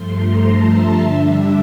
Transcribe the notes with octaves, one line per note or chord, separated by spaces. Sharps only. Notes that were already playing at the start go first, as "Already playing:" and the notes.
Already playing: G2 F3 A3 C6
A#5
A5
E5
D3 G3 D4